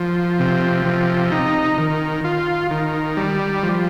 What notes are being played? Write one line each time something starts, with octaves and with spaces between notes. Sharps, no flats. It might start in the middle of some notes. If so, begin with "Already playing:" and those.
Already playing: F3
C3
F3
D#4
D#3
F4
D#3
G3
F3